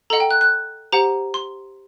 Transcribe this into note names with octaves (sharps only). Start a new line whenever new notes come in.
A4 D#5 F#5 A#5
G5
F#6
F#6
G4 C5 F#5 A#5
C6